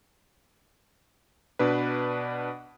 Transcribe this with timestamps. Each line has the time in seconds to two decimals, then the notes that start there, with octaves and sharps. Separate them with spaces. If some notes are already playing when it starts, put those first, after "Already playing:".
1.59 B2 D4 B4